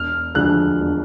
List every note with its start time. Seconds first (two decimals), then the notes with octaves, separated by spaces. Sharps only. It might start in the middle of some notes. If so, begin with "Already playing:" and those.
Already playing: E1 F6
0.35 D2 D3 F3 G#3 F#6
0.79 E1